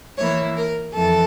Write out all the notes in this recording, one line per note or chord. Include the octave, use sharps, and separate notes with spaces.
E3 A#3 E4 C#5
A#4
F2 E3 A4